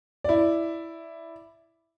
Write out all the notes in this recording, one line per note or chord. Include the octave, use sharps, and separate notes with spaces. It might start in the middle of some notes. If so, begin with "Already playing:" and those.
E4 D5